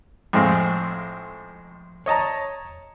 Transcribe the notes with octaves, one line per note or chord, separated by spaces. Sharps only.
F2 A2 G#3 C4 F5
C#5 D#5 A5 A#5